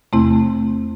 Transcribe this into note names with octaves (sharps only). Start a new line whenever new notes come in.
E2 C3 A3 C4 E4